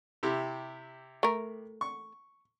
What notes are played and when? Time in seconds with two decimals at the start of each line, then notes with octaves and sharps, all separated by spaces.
0.23 C3 E4 G4
1.23 A3 A#4
1.81 C#6